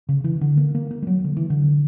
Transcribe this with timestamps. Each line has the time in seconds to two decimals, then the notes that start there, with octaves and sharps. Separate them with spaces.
0.09 C#3
0.24 E3
0.41 D3
0.57 A#3
0.74 A#3
0.91 A#3
1.02 G3
1.07 F#3
1.24 D3
1.37 E3
1.50 D3